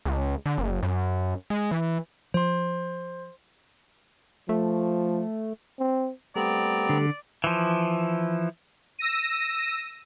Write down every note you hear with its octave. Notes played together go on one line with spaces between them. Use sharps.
C#2
D3
F#1
F#2
G#3
E3
F3 C5 C6
F3 A3
C4
G3 A3 B3 C4 D5 A#5
D3
E3 F3
E6 A#6 D#7